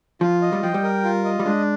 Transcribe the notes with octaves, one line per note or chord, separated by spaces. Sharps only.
F3 F4
D#5
G3
F3 G5
G3
A#4
F4
D#5
G3
G#3 D4